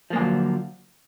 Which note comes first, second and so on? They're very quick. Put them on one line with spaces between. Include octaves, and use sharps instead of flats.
F3 A#3 G#3 D3 F#3